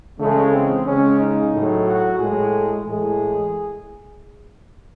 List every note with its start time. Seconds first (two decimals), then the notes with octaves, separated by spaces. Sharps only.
0.20 C#3 E3 G#3 A3
0.53 C4
0.86 C#3 G#3 C#4
1.19 D#4
1.52 A2 F#3
1.86 F#4
2.18 A2 G#3 G#4
2.85 A2 E3 G#3 G#4